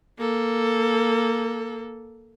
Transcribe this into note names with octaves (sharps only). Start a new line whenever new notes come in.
A#3 A4